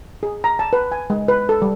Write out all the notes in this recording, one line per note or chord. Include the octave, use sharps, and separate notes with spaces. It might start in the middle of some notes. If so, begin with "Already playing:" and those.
G#4
A#5
A5
B4
G#5
G#3
B4
A4
G3